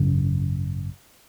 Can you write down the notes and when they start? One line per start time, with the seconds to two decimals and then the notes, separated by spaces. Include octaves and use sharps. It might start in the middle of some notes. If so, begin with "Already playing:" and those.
Already playing: G#1 F#2 C#3